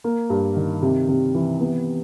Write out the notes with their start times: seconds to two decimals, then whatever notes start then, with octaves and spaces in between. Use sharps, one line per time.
0.04 A#3
0.30 G2
0.56 D#3
0.82 C3
1.09 C3
1.34 E3
1.61 B3